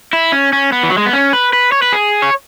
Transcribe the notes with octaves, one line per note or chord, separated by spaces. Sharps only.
E4
C#4
C#4
B3
E3
F#3
G#3
B3
C#4
B4
B4
C#5
B4
G#4
C#5